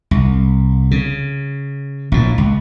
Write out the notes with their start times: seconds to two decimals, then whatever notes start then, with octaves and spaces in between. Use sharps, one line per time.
0.11 C2
0.91 C#3
2.12 A#1 A2
2.38 C#2